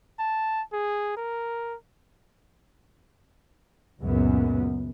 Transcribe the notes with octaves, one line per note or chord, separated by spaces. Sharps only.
A5
G#4
A#4
C#2 F#2 A#2 B3